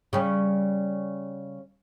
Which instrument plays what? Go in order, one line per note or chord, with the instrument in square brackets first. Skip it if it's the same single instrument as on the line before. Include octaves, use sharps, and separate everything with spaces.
[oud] C#3 G3